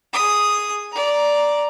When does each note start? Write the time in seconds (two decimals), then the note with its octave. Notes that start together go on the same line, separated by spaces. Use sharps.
0.13 G#4 D#6
0.92 D5 A#5